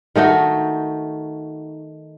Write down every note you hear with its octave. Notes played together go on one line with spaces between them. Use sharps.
D#3 A3 D#4 F#4